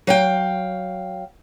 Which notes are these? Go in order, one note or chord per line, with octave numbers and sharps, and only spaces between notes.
F#3 F5 G5